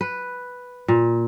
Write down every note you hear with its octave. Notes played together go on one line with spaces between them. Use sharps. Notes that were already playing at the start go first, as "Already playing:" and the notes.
B4
A#2